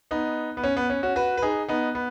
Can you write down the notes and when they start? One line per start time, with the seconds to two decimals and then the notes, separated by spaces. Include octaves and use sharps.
0.11 B3 D#4
0.57 B3
0.64 C#4
0.77 B3
0.90 C#4
1.03 C#4 F#4
1.16 F#4 B4
1.37 B4
1.42 D#4 G#4
1.69 B3 D#4
1.95 B3